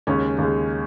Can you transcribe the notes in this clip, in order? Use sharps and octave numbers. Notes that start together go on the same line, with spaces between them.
D#2 C#3 G#3 C#4
D#2 C#3 G#3